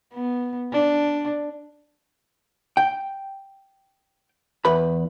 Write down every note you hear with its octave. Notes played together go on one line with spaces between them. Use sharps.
B3
D4
G5
E2 B4 B5